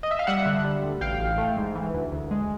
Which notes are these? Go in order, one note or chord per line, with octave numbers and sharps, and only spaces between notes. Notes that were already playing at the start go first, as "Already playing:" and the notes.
D#5
E5
F5
G3 E5 F#5
D3
G3
D2
A1 F5 G5
A1
A3
G#2
E3
D2
D2
G#3